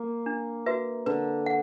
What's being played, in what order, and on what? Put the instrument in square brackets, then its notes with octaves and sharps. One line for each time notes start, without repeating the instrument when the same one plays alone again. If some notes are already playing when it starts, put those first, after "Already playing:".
Already playing: [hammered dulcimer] A#3
[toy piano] D4
F#4 B4 E5
[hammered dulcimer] D3 [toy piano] B4
[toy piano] F#5